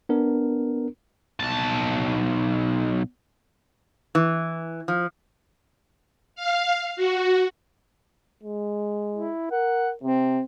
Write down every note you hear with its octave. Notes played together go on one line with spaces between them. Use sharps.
B3 D4 A#4
B1 A5
E3
F3
F5
F#4
G#3
E4
A#4 F#5
C3 C4